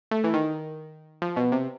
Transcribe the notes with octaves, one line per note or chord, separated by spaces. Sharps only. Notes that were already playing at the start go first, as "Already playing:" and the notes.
A3
E3
D#3
F3
B2
C3